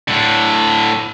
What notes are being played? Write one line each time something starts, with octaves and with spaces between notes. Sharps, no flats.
A2 D3